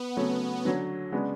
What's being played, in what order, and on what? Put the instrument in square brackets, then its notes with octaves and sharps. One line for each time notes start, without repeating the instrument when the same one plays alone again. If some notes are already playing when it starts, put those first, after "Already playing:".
Already playing: [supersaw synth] B3
[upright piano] C#3 F#3 A3 C#4
D3 F#3 C#4
C#3 G#3 B3 D4